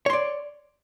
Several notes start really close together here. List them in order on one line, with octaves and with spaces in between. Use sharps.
C#5 C6 D5